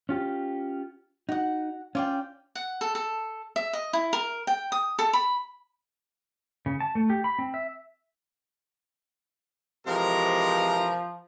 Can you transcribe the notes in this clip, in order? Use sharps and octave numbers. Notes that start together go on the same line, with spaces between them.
C#4 F4 G4
D#4 F#4 F#5
C#4 F4 D5 G5
F#5
A4
A4
E5
D#5
E4
A#4
G5
D#6
A4
B5
C#3
A5
A3
G4
B5
C4
E5
C3 E3 F3 G#3 A#4 A#5